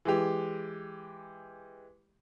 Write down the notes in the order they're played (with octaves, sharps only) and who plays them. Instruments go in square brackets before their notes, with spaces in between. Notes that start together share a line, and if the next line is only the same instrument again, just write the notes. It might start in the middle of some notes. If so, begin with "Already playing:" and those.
[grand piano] E3 G#3 G4